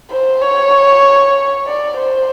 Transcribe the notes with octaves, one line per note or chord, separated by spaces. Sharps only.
C5
C#5
D5
C5